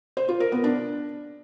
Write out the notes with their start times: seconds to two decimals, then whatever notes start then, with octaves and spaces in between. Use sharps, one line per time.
0.17 C5
0.29 F4
0.40 A#4
0.52 B3
0.64 D4